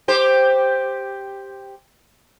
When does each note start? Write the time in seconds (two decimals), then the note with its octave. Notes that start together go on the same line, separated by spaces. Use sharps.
0.08 G4 C5